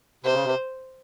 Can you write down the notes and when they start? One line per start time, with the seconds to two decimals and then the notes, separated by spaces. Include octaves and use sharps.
0.24 C3 C5
0.34 C#3
0.44 C3